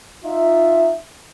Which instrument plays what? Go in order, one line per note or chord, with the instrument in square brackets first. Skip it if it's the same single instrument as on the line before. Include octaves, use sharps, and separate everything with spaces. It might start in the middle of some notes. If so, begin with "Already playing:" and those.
[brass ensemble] D#4 F4 E5